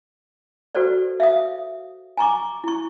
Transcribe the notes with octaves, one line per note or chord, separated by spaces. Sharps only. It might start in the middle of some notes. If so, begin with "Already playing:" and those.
F#4 A4 B4 C5 D5
E5 F5 D#6
G#5 A#5 C#6 D6
E4 C#6